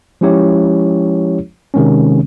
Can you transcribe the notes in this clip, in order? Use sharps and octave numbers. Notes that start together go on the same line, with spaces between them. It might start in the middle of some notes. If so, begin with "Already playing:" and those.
F3 G#3 C#4 E4 G4 C#5
C3 D#3 G#3 C4 C#4